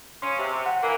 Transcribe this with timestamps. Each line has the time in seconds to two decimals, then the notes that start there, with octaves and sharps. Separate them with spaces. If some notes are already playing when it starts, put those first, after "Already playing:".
0.22 C#3 C#4 C6
0.38 C3
0.66 F#5
0.82 E3 A#3